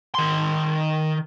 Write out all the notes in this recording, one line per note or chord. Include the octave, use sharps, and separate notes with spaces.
D#3 C6